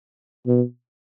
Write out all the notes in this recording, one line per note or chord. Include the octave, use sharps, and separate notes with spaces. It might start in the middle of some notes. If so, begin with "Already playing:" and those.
B2